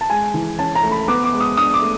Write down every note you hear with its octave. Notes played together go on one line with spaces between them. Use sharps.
A5
G#3 G#5
E3
C#4 A5
A#5
A3
B5
B3 D6
D6
G#3
D#6
D4 D#6
D6
A3